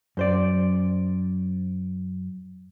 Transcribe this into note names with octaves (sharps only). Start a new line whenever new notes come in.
F#2 C5 D5